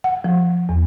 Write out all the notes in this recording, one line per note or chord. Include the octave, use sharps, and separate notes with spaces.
F#5
F3
E2